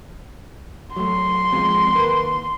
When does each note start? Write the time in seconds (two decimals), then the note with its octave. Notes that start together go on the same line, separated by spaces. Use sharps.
0.96 F#3 A3 C6
1.53 F3 G#3 C4
1.95 D#2 A#4 B4